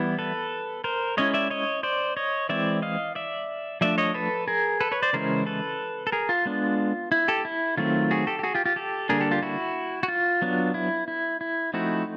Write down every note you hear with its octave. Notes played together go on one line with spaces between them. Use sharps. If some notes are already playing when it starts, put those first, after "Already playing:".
Already playing: E3 G3 B3 E4
A4 B4
A#4 C5
G#3 C#4 E4 C#5 D#5
D5 E5
C#5 D#5
C5 D5
C#5 D#5
E3 G#3 C4 E4 D5 E5
D#5 F5
D5 E5
F3 A3 D4 D5 E5
C#5 D#5
A4 B4
G#4 A#4
A4 B4
B4 C#5
C5 D5
C#3 E3 G#3 C#4 E4 A#4 C5
A4 B4
A4
G#4 A#4
F4
G#3 B3 D4
E4
G4 A4
E4
D#3 F#3 A3 C4 F4
F#4 G#4
G4 A4
G4
F#4 G#4
F4 G4
F4 G4
G4 A4
D3 G3 A#3 D4 G#4 A#4
G4 A4
F4 G4
E4 F#4
F#4
F4
F#3 B3 D4
E4
E4
E4
F3 A3 C4 D#4 E4 F#4